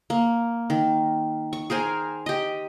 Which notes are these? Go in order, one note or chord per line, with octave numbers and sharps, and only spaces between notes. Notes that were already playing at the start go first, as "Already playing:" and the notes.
A#3
D#3
C#6
G#4 A#4 C5 G#5
G4 D#5